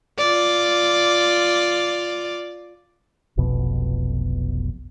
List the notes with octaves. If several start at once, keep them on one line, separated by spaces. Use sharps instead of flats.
F4 D5
F1 B1 F2 B2